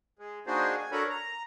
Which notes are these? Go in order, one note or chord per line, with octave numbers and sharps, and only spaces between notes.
G#3
A#3 D4 D#4 F#4 G#4 C5
G#5
D4 F#4 A4 A#4 C#5 B5
A#5